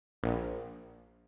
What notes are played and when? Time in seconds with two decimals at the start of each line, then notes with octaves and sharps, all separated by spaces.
0.23 A#1